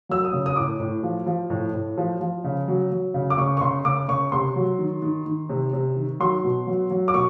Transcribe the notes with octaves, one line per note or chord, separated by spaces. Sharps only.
F#3 E6
D#6
C#3
D#6
A2 D6
A2
F3
F3
A2
A2
F3
F3
C#3
F#3
F#3
C#3
D6
C#3 C#6
C#6
C#3 C6
C#3 D6
C#3 C#6
C3 C6
F#3
D#3
D#3
D#3
C3
C3
D#3
F#3 C6
B2
F#3
F#3
D6
B2 C#6